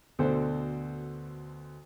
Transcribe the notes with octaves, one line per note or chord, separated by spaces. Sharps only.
D2 B2 D3 A4 C5